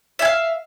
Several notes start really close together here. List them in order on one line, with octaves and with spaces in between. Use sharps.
E5 G#5 F5